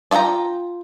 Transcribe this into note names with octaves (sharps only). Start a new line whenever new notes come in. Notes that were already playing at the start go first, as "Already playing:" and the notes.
D4 F4 F#5 G5 A#5